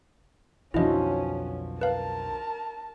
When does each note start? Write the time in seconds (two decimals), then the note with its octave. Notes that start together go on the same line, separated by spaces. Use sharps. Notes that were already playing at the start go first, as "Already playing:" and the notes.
0.74 B1 F2 D3 F3 C#4 E4 F#4 D#5
1.81 A#4 B4 F5 A5